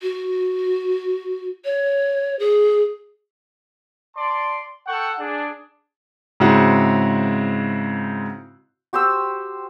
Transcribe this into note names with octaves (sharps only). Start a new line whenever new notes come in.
F#4
C#5
G#4
D5 A5 C6
A4 F#5 G5 C#6
D4 G#4
G#2 C#3 C4 E4 F#4
F#4 G4 C5 E6